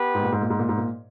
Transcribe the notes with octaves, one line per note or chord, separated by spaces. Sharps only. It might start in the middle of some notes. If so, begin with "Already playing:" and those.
Already playing: B3 G4 B4
G#2
A#2
G#2
A#2
G#2
A#2
G#2
A#2